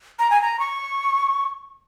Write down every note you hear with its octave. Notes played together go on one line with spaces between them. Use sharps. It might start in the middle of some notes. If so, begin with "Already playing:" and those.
A#5
G#5
A#5
C#6